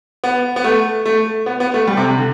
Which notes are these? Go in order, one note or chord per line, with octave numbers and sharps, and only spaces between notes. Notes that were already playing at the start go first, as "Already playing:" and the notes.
B3
B3
A3
A3
B3
B3
A3
G3
C3
C3
D3